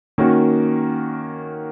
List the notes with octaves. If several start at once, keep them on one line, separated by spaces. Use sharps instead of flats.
D#3 A#3 C#4 F#4